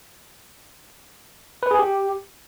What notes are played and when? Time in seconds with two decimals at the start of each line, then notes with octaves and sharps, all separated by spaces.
1.63 B4
1.71 G#4
1.79 G4